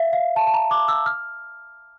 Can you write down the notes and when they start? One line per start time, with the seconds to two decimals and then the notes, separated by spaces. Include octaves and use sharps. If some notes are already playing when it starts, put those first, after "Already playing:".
Already playing: E5 F5
0.13 F5
0.36 A5
0.47 A5
0.54 A#5
0.71 D6
0.88 E6
1.06 F6